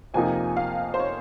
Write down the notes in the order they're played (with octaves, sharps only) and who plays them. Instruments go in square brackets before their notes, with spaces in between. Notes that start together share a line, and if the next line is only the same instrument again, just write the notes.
[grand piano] F2 C3 F3 A#3 D#4 [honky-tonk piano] G#5
[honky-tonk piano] F5
C5
C#5